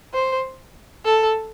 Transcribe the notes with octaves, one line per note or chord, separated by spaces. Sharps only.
C5
A4